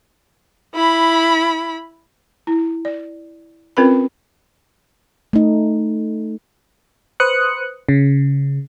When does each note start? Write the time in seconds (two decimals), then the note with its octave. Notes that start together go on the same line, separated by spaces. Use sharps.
0.75 E4 B5
2.47 E4
2.85 D5
3.77 C4 C#4 F4 A#4 B4 B5
5.33 A3 D#4
7.20 B4 C5 D#6 F#6 C#7
7.89 C#3